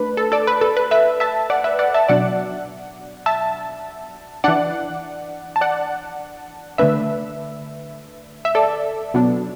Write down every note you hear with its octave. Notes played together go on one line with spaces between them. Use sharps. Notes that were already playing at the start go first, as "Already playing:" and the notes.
Already playing: A3 D4 B4
A4
A4 D5
B4
A4
B4
B4 E5
E5 A5
D5 F#5
B4 E5
D5 F#5
E5 A5
B2 F#3 D4 D5 F#5
E5 A5
E3 D4 D5 F#5
A5
D5 F#5
D3 A3 D4 B4 E5
E5
A4 D5
B2 F#3 B3 D4